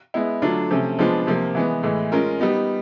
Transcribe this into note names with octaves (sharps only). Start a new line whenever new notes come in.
G#3 B3 E4
D3 F#3 A3 D4 F4
C3 F3 A3 C#4
F3 G#3 B3 D4 F4
C3 F3 A#3
E3 G#3 B3
A2 E3 G#3
G#3 C#4 F4 A#4
G3 B3 D#4